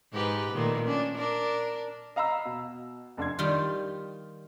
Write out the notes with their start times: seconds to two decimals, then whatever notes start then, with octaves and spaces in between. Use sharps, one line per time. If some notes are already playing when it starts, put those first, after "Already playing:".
0.13 G#2 G4 B4
0.52 A#2 D#3 A3
0.84 C#4 D4
1.17 D4 A#4
2.16 D#5 F5 A#5 B5 E6
2.45 B2
3.17 F1 D4 C6 G#6
3.39 D#3 G3 F4